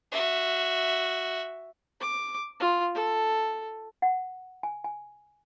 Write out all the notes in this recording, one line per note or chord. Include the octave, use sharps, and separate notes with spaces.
F#4 E5
D6
F4
A4
F#5
G#5
G#5